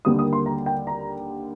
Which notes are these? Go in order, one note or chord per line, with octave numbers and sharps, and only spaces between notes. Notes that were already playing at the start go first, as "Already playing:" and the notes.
D#2 D3 G3 A#3 D#6
D#6
C6
A#5
G5
A#5